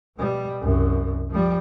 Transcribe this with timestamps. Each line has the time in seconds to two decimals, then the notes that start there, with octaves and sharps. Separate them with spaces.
0.17 B2 G3
0.61 C2 F#2
1.30 F3 G3